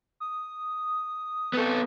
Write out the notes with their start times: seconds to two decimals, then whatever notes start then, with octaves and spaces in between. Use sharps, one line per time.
0.20 D#6
1.53 B3 C4 A4